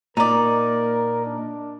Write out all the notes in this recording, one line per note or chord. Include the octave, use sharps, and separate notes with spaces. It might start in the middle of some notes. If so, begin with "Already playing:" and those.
A#2 D#4 A#4 D5
D4